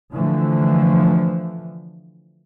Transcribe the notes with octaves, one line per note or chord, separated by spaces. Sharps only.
D3 E3 F3 A3